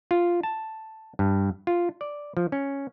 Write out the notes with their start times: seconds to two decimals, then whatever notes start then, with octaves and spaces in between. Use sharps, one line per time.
0.11 F4
0.43 A5
1.19 G2
1.67 F4
2.01 D5
2.37 F3
2.52 C#4